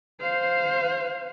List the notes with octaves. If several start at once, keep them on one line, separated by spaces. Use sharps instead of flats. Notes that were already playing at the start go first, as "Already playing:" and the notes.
C5 F5